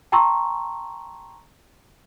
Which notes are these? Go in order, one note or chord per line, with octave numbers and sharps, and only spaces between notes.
G5 A5 A#5 C6 C#6 E6